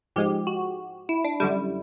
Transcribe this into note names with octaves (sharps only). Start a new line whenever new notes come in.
G#2 F3 G#3 G4
F#4
E4
D4
F#2 D3 G3 E4